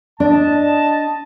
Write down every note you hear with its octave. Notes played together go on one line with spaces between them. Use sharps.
D4 D#5 A5